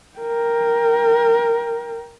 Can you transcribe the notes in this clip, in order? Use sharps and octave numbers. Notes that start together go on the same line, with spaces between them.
A#4 G5